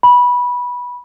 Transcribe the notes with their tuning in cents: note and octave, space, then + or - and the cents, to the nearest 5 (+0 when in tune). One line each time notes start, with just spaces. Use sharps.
B5 -15